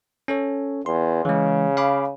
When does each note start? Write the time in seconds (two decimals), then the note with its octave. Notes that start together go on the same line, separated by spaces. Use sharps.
0.28 C#4 A4 C#5
0.86 E2 C6
1.25 C#3 E3 G#3
1.77 F5 B5 D6